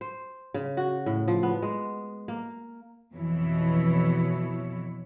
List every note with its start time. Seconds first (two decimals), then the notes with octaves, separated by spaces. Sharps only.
0.01 C5
0.54 C#3
0.77 F#4
1.06 A2
1.28 F3
1.43 B3
1.62 G#3
2.28 A#3
3.14 F2 B2 E3 E4 C#5